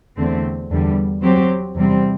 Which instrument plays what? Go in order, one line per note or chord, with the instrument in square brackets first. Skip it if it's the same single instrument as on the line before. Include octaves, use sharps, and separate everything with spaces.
[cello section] E2 D3 A3 C4
E2 D3 G3
F#3 C4 G4 C5
E2 C3 G3 C4